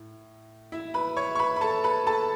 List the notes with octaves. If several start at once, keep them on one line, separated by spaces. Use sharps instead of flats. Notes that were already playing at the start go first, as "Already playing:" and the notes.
Already playing: A2
E4 E5
B4 B5
C#5 C#6
C#6
B4 B5
B5
A4 A5
B4 B5
A4 A5